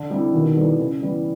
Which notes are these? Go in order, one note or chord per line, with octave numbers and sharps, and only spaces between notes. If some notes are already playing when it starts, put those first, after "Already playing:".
Already playing: D3
G3 C4 E4
B2 D#3
G3 B3 E4 A4
C#3
E3 G3 B3 E4